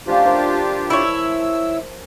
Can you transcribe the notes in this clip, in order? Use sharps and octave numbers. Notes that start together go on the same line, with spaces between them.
F3 A3 C#4 D4 F4 G4
A#4 C5 A5
E4 C#5
E6